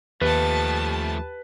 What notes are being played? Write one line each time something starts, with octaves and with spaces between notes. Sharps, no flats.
D#2 F3 A3 G4 B4 A5